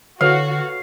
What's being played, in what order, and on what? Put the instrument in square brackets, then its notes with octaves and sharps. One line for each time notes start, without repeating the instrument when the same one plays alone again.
[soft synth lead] D3 [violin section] F#4 [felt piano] A4 B4 C#5 [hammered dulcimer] F5